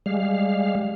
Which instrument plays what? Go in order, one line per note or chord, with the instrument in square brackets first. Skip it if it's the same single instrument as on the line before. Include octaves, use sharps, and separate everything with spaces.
[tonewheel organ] G3 G#3 F5